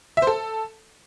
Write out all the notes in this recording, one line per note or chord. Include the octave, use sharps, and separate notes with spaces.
E5
C5
A4